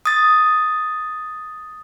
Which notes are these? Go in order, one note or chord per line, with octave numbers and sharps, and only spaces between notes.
D#6 A6